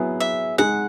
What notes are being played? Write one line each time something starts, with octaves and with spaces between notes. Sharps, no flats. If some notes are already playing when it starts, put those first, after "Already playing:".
Already playing: F#3 B3 E4 G#4
E5
G#3 D#4 G#4 F#5